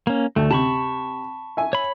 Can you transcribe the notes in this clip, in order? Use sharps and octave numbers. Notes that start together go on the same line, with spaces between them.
A#3 C#4
D2 A3
C3 A5 B5 C#6
E5 G#5
C#5 B5